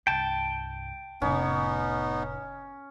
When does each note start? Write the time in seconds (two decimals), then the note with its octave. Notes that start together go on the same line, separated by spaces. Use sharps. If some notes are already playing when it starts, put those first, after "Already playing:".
0.07 C2 G2 G5 A5
1.22 F1 A2 B3 C#4 D#4